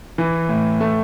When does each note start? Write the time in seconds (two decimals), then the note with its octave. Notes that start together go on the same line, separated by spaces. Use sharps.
0.18 E3
0.49 A2
0.80 A3